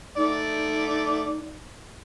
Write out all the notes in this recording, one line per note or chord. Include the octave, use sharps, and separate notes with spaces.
A3 D#4 D5